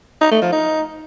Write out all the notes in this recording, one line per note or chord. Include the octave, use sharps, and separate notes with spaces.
D#4
A3
F3
D#4